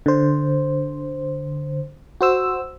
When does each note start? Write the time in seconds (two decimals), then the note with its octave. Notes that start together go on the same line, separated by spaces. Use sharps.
0.06 D3 C5
2.21 F#4 C5 E6